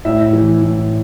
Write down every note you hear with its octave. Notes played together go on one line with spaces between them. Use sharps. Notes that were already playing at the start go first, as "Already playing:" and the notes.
A2 E5
E3
A2